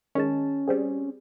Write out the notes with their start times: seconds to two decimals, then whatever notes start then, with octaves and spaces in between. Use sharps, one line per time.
0.15 D#3 G#3 C#4 A5
0.68 G3 C4 G#4